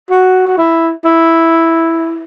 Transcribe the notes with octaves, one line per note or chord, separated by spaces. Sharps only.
F#4
F#4
E4
E4